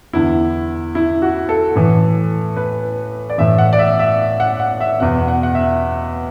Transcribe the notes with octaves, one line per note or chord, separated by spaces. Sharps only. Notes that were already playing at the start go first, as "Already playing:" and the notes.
E2 D3 E4
E4
F#4
A4
A2 E3
B4
D5
A2 E3 E5
F#5
D5
E5
E5
F#5
F#5
E5
E2 B2 F#5
F#5
F#5
E5